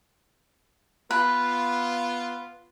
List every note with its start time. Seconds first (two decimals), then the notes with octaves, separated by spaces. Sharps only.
1.11 B3 F4 B4